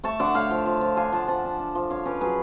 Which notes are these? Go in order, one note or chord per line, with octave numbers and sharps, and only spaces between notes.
A3 A5 C#6
D3 D5 F#5
A3 C#5 F5
F3
F3
F3
D4 F5 G#5
F3 F#5 A5
F3 F#5 A5
D4
D4
F3
D3 C#5 F5
C#4 B4 D5
F#3 G#4 B4